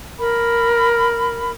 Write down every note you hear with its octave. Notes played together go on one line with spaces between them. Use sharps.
A#4 B5